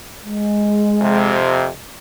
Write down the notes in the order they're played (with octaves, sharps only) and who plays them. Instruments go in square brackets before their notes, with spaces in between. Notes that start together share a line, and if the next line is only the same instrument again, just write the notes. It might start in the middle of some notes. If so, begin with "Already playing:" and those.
[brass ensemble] G#3
[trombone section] F2 C3